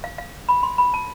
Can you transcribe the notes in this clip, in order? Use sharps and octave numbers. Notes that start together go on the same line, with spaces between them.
F5
F5
B5
C6
B5
A5